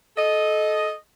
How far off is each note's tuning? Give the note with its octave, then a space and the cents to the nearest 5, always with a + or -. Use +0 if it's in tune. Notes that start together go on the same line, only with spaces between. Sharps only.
A4 -25 D#5 +0